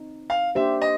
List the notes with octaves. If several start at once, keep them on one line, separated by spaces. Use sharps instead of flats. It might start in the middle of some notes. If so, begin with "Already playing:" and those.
Already playing: C4 D#4
F5
A#3 D4 G4 C5 E5
D#5